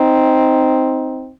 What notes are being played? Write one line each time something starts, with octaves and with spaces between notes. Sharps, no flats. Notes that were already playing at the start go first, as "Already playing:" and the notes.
Already playing: C4 D#4